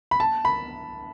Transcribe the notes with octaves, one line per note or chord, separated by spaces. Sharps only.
B5
A5
B5